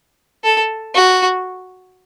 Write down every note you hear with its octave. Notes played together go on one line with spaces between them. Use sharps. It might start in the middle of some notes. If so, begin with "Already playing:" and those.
A4
F#4